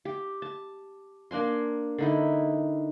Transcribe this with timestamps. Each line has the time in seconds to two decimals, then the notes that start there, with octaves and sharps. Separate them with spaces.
0.05 G4
0.42 A5
1.31 A#3 D4 G#5 C6
1.98 D3 D#4 E4